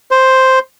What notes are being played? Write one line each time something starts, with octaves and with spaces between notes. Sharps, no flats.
C5